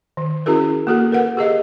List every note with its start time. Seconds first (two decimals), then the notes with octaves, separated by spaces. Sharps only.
0.17 D#3
0.46 C#4 E4 F#4 G#4 A#4
0.87 A#3 F#4 A4
1.12 A#4 B4 F#5
1.37 G4 G#4 D#5 F5